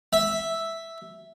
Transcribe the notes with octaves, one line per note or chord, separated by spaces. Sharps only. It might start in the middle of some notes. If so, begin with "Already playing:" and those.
E5